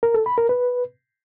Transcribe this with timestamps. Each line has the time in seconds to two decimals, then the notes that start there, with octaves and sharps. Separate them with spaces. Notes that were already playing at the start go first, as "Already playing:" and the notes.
0.03 A#4
0.14 A4
0.26 B5
0.38 A#4
0.49 B4